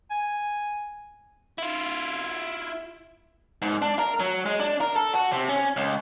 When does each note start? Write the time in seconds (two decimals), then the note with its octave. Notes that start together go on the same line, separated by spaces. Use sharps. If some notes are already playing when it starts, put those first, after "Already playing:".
0.11 G#5
1.58 E4 F4
3.62 G#2
3.82 D4
3.99 A#4
4.20 F#3
4.46 G#3
4.60 D4
4.81 A#4
4.96 A4
5.13 F#4
5.32 C3
5.49 C#4
5.77 C#2